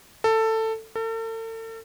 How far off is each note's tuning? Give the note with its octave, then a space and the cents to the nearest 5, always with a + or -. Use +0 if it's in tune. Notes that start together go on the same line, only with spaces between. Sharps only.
A4 +15
A4 +40